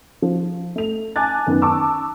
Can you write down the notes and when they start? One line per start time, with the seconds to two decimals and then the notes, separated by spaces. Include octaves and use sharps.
0.22 F3
0.76 A3 F7
1.16 G#5 A5 D6 F#6 A6
1.46 F#2 D#3 B3 C#4
1.62 A5 C#6 D6 E6